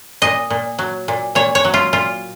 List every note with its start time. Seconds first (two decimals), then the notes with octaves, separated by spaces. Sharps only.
0.22 A#2 D#5
0.50 A#2
0.79 F#3
1.08 A#2
1.35 A#2 C#5
1.55 C#5
1.65 F#3
1.74 F4
1.93 A#2 F4